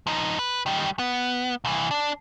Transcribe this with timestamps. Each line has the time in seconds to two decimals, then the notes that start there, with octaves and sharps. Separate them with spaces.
0.07 F3 D#4
0.39 B4
0.66 D#3 G3
0.99 B3
1.65 C2 E3
1.91 D4